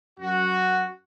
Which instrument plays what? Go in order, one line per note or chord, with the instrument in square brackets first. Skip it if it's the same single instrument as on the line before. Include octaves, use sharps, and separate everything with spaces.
[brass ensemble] F#2 F#4